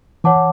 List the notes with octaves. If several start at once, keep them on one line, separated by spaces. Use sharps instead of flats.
E3 C#5 F#5 A5 D6